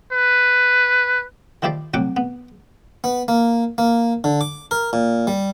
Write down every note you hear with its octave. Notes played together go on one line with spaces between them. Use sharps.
B4
D#3 F3 E4 G4 C5 D5
C2 A2 F#3 F#5 G5 D6
B3
B3
A#3
A#3
D3
D6
A#4
A#2
G3